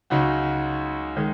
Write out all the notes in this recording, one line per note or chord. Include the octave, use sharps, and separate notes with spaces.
C#2 C#3 F#3 D#4 F#4
D#3 G#3